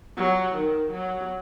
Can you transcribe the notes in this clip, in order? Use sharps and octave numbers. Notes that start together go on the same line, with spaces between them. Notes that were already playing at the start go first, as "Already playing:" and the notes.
F#3
D#3
F#3